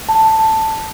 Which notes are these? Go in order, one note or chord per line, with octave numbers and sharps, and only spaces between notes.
A5